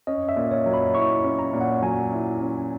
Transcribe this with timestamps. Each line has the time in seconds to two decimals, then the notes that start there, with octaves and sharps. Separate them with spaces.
0.07 C#4 D#5
0.29 E5
0.36 A#2
0.51 C#5
0.66 F#3
0.74 B5
0.95 E4 C#6
1.24 C#4
1.39 A#5
1.53 A#2
1.61 F#5
1.82 F#3 G#5
2.12 E4
2.41 C#4